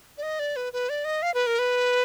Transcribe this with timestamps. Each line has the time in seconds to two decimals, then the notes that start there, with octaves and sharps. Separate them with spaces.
0.18 D5
0.23 D#5
0.39 D5
0.56 B4
0.73 B4
0.89 D5
1.05 D#5
1.22 F5
1.34 B4
1.47 A#4
1.59 B4